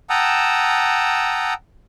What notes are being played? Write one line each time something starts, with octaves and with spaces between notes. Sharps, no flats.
F#5 G5 A5 A#5 D#6 E6